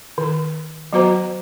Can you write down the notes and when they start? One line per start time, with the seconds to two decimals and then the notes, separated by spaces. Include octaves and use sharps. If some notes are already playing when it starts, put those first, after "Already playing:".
0.18 D#3
0.93 F#3 B3 F#4 C5 A#5